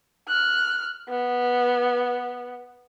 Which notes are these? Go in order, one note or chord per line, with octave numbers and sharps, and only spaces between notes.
F6 F#6
B3